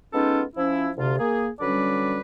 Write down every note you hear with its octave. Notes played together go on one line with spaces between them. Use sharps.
G#3 B3 C#4 D#4 F4 A4
F3 C#4 E4
D2 C3 F4
A#3 G#4
D3 F#3 G3 C#4 B4 D5